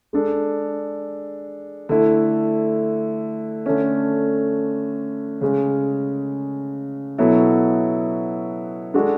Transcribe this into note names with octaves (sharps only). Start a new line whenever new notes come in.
G#3 D4 A4
D3 A3 E4
D3 A3 C#4
C#3 G#3 C#4
B2 F#3 B3 E4 A4
G#3 D4 F#4 A4